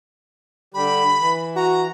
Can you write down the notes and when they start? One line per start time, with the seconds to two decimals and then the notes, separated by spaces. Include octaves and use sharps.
0.74 D3 G3 G4 B5
1.19 E3
1.56 F#4 A#5